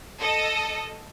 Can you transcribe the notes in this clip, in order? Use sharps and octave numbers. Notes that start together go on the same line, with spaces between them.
A4 D#5